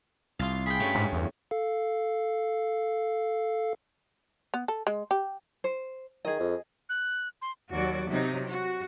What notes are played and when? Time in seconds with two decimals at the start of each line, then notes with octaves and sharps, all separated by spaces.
0.39 C2 F4 F5
0.66 G#4 G5 B5
0.80 G2 A3 C#4
0.95 G#2
1.13 E2
1.51 A4 F5
4.54 B3
4.68 A4
4.87 G#3
5.11 G4
5.64 C5
6.25 D#3 G#4 D#5
6.39 F2
6.89 F#6
7.42 C6
7.72 D#2 F#3 F#4 D5
8.09 C3 F#3 D#4
8.48 F#4